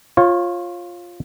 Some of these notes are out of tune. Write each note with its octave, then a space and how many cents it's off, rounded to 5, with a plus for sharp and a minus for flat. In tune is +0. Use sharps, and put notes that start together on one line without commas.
F4 +5 C#5 -30